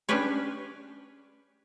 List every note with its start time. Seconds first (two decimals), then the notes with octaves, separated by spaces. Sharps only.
0.09 C#4 D4 G4 B4 C#5